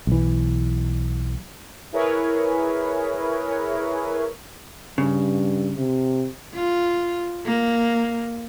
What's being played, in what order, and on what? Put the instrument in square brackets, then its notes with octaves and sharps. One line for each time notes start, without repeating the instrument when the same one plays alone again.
[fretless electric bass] B1 E3
[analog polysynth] E4 G#4 A#4 B4 C#5
[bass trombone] G2 [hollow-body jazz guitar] C#3
[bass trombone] C3
[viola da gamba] F4
A#3